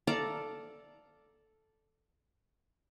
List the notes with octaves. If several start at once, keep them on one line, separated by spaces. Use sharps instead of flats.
A4 D5 F5 A#5